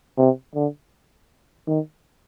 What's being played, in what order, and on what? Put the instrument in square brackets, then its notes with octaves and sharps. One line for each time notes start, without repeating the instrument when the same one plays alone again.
[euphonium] C3
D3
D#3